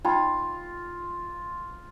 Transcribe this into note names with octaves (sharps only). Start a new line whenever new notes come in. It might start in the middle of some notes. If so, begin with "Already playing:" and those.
D#4 F4 G5 B5